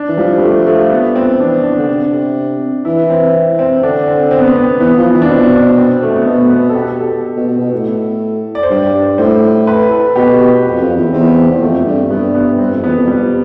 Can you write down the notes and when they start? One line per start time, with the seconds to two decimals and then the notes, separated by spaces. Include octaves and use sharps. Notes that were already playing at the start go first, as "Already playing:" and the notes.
Already playing: D4
0.09 E3
0.17 F3 G3
0.38 G3
0.42 A3
0.67 A3
0.91 B3
1.15 C4
1.40 E3 D4
1.64 D4
1.78 D3
1.88 C3
2.85 E3 E4
3.10 C4
3.59 C4
3.82 D3 D4
4.08 C4
4.31 C4
4.39 B3
4.48 C4
4.55 B3
4.80 E3 B3
4.97 F3
5.04 B3
5.13 E3
5.22 D4
5.29 B2 C4
5.53 D4
5.78 C4
6.03 A3
6.16 B3
6.26 B2 A3
6.50 B3
6.69 A4
6.75 G4
6.99 A4
7.36 B2
7.48 B2
7.60 B2
7.72 A2
8.55 D5
8.63 C5
8.70 G2 D5
9.18 A2 C5
9.67 B4
9.91 A4
10.16 B2 G4
10.65 F2
10.81 F2
10.96 E2
11.13 E2 C4
11.38 C4
11.50 E2
11.61 F2 A3
11.86 G2
12.10 G2 B3
12.34 B3
12.58 G2 C4
12.72 F2
12.84 E2 B3
12.97 F2
13.07 G3